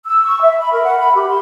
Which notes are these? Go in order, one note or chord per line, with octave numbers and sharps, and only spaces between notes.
E6
C#6
E5
B5
A#4
F#5
B5
G4
C6